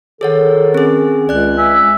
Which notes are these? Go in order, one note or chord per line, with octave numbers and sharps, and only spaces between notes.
D#3 G#4 A4 C#5 F#5
C4 C#4 G#4
C#2 D5 F#6
E5 G#5